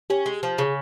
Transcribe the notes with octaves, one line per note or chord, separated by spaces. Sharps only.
C#4 G4
G#3
F3
C#3 G#4